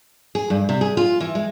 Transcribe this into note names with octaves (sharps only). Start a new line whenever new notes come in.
G#4
G2
C3
G#4
F4
E3
G#3